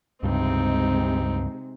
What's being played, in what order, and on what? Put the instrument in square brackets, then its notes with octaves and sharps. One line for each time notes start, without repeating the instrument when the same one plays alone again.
[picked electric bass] C#2 G2 [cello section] C3 G#3 [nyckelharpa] C4 D#4